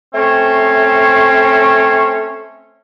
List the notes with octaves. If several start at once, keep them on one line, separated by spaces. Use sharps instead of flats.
A3 C4 C#4 C#5